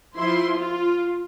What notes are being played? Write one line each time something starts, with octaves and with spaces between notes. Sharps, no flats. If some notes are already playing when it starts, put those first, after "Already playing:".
F3 E4 C6
F4